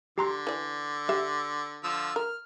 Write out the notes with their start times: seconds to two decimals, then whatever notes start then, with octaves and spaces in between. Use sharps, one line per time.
0.18 D3 G4 A#5 C6
0.47 E3 D5
1.09 G4 E5
1.84 D3 F3 E6
2.16 A#4 F6